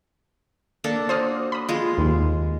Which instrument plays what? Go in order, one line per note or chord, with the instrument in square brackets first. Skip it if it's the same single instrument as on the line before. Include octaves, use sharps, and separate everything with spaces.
[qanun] A#3 D4 A4
[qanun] F#4 [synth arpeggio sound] C5 D#6 F6
[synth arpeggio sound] B5 D#6
[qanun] G#3 F4
[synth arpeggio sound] D#2